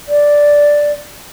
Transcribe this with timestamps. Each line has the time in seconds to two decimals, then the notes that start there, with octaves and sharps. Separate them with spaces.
0.08 D5